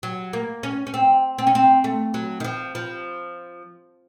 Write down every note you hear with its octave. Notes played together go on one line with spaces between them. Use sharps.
F#3
A#3
C#4
C#4
C4
C4
C#4
C4
A3
F#3
D#3
F3
F3